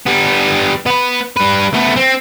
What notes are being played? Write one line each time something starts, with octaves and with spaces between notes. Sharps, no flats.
G3 B3
B3 B4
G3 B4
A3 B3
C4